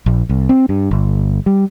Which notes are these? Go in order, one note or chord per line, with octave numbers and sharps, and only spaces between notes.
A#1
C2
C4
G2
G1
G3